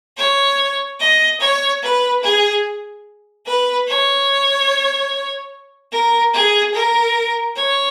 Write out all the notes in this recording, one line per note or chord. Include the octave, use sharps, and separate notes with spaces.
C#5
D#5
C#5
B4
G#4
B4
C#5
A#4
G#4
A#4
C#5